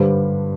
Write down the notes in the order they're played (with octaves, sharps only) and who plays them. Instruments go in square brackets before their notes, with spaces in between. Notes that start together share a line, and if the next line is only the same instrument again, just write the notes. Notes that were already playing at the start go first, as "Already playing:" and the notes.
Already playing: [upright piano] G2 D3 G3 C5